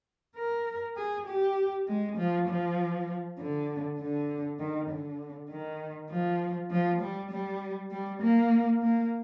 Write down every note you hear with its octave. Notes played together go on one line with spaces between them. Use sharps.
A#4
G#4
G4
G#3
F3
F3
D3
D3
D#3
D3
D#3
F3
F3
G3
G3
G3
A#3
A#3